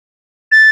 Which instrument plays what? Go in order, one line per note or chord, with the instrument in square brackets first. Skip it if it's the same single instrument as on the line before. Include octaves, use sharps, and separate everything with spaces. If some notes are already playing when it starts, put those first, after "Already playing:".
[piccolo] A6